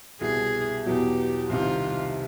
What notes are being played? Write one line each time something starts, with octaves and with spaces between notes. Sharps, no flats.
C2 B2 G3 G#4
E2 B2 F#3 G4
C2 C3 D#3 F4